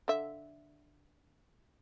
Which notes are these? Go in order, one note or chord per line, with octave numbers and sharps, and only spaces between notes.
D3 E5